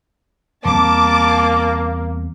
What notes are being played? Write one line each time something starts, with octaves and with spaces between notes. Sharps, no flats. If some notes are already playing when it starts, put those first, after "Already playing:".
E2 G3 A#3 C4 A5 D6